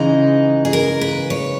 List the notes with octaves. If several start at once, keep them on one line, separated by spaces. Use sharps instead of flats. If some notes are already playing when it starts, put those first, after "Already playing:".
Already playing: C#3 E3 G#3 D#4
G#4
A#4
B4
C#5